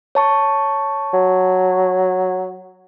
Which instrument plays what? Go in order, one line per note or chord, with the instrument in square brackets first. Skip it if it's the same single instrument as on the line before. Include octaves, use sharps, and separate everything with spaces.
[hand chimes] C#5 A5 C#6
[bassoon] F#3